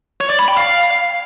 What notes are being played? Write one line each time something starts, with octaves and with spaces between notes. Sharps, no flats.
C#5
D5
B5
G5
F5